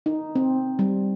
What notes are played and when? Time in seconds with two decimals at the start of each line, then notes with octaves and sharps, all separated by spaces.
0.06 D#4
0.35 C4
0.79 G3